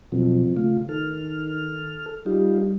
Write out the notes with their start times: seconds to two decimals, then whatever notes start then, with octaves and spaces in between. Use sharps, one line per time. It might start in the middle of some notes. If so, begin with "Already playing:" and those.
0.12 F2 B2 F#3
0.56 C#3 A3 F4
0.89 D#3 A4 F6
2.26 G3 D#4 F4 G4